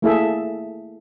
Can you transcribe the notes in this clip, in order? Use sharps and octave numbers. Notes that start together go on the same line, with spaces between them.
A3 A#3 E4 G#4 A4 E5